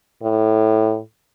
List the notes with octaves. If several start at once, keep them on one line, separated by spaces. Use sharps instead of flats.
A2